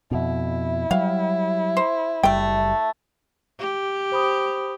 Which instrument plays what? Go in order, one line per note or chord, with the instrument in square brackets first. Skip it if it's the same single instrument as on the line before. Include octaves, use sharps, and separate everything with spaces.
[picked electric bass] F2 B2 [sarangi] E4
[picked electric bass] F#3 G3 [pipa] F5
[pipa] C5
[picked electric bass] F#1 G3 [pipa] A3 G5
[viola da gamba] G4
[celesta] C5 B5 D#6